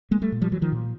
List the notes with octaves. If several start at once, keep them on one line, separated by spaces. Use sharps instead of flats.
G#3 A#3
G3 A3
A#2
F3 G3
E3 F#3
D#3 F3
A#2